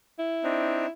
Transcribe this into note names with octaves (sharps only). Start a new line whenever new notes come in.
E4
C4 D4 D#4